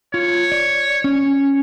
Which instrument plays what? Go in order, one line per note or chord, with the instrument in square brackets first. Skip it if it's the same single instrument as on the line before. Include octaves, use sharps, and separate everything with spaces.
[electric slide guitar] F4 [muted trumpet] C#5
[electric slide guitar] D5
C#4